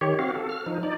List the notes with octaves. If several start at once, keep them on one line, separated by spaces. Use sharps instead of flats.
D#3 G4 C#5
C4 F#4 F5
A4
F6
F3 D#4
D#4 D5